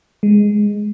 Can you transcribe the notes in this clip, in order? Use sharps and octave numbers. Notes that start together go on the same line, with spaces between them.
G#3